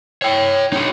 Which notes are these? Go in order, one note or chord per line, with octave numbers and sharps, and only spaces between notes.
C#5 G5
D#4 F#4